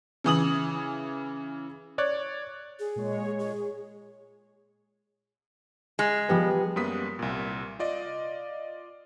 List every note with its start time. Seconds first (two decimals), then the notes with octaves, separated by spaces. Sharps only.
0.24 C#3 E3 D#6 F#7
1.98 C#5 D5 F#6
2.79 G#4
2.96 A#2 G#3 C#5
3.39 G#4
5.99 G#3
6.29 F3 G3 B3
6.76 F#2 G3 A#3 B3 D#6 B6
7.19 C2 A#2
7.79 F4 D5 D#5